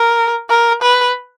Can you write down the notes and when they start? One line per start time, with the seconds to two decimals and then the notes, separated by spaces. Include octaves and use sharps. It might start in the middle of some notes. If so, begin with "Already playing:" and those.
Already playing: A#4
0.49 A#4
0.82 B4